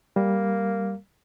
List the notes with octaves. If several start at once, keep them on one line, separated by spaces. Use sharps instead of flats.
G3 A#3